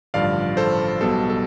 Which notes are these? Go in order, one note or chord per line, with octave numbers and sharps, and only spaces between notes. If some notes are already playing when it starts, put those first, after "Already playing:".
A1 G2 D3 F3 D5 F5
A4 C5
B1 B2 G3 A4
A4